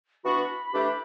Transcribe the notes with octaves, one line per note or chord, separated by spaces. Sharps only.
E3 B3 D4 F#4 B5
E3 A3 D4 G4